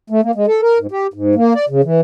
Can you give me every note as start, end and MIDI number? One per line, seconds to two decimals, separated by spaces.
0.10 0.21 57
0.23 0.31 58
0.35 0.46 56
0.47 0.61 69
0.62 0.78 70
0.79 0.87 44
0.91 1.07 67
1.14 1.35 44
1.35 1.53 58
1.55 1.65 74
1.69 1.81 49
1.84 2.01 52